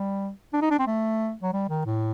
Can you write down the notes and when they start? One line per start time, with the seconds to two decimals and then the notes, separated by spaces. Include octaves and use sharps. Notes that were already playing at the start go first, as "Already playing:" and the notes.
Already playing: G3
0.53 D4
0.62 D#4
0.71 D4
0.79 C4
0.87 A3
1.42 F#3
1.53 G3
1.69 D#3
1.86 A2